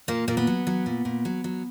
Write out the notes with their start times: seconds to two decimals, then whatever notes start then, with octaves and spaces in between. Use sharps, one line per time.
0.08 A#2 A#3
0.28 A#2 A#3
0.37 B3
0.47 F#3
0.67 F#3
0.86 A#2
1.05 A#2
1.25 F#3
1.44 F#3